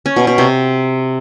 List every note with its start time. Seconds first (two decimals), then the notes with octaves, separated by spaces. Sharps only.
0.06 C#4
0.16 B2
0.27 B2
0.38 C3